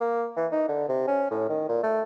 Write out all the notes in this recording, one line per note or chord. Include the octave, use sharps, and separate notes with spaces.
A#3
E3
D#4
D3
C3
C#4
A2
D#3
A#2
A3